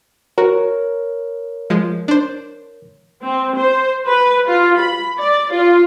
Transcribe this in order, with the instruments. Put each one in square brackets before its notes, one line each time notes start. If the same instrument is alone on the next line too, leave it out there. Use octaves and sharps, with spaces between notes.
[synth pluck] F#4 [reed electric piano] A#4 C#5
[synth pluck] F3 G#3
D4 C5
[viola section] C4
C5
B4
F4
B5
D5
F4